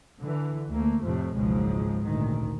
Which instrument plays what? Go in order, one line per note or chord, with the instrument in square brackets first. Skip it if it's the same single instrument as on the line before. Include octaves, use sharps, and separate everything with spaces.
[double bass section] D3 E3
D2 A3 A#3
F2 A2 C3 F3 A3
F#1 C#2 G#2 B2 F3 G#3
A1 D2 A#2 D#3